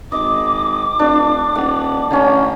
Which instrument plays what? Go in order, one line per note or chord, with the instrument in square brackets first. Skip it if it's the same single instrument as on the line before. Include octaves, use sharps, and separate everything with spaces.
[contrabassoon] G#1 [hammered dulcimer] D#5 [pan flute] D6
[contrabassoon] F1 [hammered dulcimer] D4
[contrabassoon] D#1 [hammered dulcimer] F#5
[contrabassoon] A1 [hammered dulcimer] D3 C#4